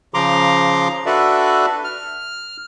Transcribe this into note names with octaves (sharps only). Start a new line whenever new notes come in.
C#3 F3 A#5 C6 D6
D4 F#4 A4 B4 D5 E5
F6